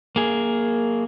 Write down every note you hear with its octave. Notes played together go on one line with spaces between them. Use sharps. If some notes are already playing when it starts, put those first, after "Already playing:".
A#3 G#4